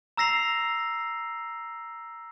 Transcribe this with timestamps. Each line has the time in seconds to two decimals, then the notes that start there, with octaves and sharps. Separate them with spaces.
0.17 A#5 E6 A#6 C7 F7